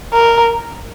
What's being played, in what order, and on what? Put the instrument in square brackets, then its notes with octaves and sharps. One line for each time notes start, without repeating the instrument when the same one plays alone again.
[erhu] A#4